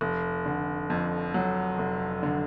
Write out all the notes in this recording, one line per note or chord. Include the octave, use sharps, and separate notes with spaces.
F1
D3
F2
F#3
F1
D3